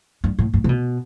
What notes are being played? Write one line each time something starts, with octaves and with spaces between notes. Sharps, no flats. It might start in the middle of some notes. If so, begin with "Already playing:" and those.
G2
A2
G2
C3
B2